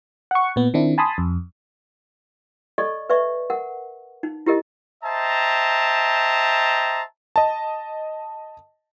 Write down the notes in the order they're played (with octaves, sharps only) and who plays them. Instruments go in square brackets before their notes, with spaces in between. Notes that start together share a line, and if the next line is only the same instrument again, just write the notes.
[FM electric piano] F#5 C#6
A#2 B3
D#3 C4 D4 E4
G#5 A5 B5 C6 D#6
F2
[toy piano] A4 D5 D#5 C#6
B4 D5 E5 C#6
A#4 F#5
D#4
E4 G4 A#4 D#5
[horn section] C5 D#5 E5 G5 A5 A#5
[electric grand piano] D#5 A5